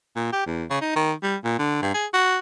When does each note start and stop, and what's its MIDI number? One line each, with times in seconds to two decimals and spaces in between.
0.16 0.32 46
0.32 0.46 67
0.46 0.64 40
0.70 0.77 49
0.81 0.91 63
0.96 1.12 51
1.23 1.36 55
1.44 1.57 46
1.58 1.82 50
1.82 1.93 43
1.94 2.06 68
2.14 2.38 66